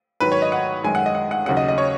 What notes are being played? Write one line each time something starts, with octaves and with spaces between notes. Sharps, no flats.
G#2 D#3 F#3 B4
C#5
D#5
F#5
F#2 D#3 G#3 G#5
F#5
D#5
F#5
F#5
D#2 C#3 F#3 C#4 F#5
D#5
D#5
C#5